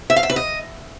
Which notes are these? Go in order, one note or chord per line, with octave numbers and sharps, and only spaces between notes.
E5
F5
E5
B4
D#5